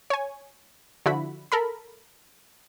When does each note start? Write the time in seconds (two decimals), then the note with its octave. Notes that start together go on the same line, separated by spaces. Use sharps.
0.10 C#5 G#5
1.06 D3 F3 E4 F#4 B5
1.52 A4 A#4 B5